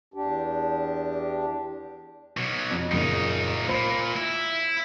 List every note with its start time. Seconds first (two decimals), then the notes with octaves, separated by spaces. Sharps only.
0.14 E2 D4 G4
2.37 B2 F#3
2.71 F2
2.91 F#1 A#2 D#4 C#7
3.69 A#2 C5 B5
4.16 E4